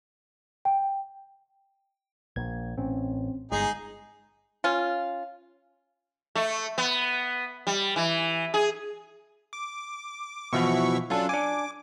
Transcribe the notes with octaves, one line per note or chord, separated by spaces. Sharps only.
G5
A#1 G#6
A1 C4 C#4
G1 G#3 D#4 G#4 C7
C#4 F4
A3
B3
G3
E3
G#4
D6
B2 E3 F3 F#4 E5 C#6
F#3 C#4 D4 F4 A4
D4 G#5 D6